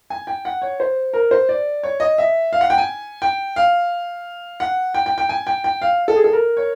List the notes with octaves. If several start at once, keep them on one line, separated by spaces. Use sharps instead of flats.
G#5
G5
F#5
C#5
C5
A#4
C5
D5
C#5
D#5
E5
F5
F#5
G5
G#5
G5
F5
F#5
G5
G5
G5
G#5
G5
G5
F5
A4
G#4
A4
A#4
C#5